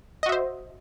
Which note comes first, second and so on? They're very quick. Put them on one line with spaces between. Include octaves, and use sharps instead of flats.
D#5 F#4 E5 C5